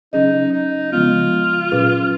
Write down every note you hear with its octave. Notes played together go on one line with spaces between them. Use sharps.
C#3 F#3 C#4 D#4 G#4 D#5
D#4
C#3 F3 G#3 B3 F4
A#2 F#3 C#4 G#4 B4